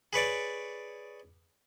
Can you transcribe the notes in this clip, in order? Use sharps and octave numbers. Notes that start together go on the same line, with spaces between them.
G#4 B4 C#5 D5